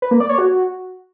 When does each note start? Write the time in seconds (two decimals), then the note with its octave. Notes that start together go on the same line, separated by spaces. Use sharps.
0.02 B4
0.11 A#3
0.20 D5
0.29 C#5
0.38 F#4